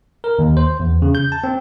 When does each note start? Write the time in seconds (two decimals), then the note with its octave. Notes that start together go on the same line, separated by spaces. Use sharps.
0.24 A#4
0.39 D#2
0.57 C5
0.80 E2
1.02 C#3
1.15 G6
1.32 A5
1.44 C4